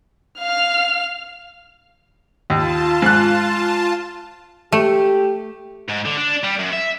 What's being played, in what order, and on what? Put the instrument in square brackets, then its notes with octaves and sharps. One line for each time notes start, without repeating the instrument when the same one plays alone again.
[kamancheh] F5 F6
[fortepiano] D#2 [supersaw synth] F4 A5
[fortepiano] G#2 F#6
[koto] A3 [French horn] G4
[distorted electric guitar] G#2
D3
D4
G3
F#2
E5